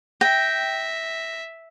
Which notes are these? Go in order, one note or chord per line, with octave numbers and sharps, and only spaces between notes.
E5 G5 A#6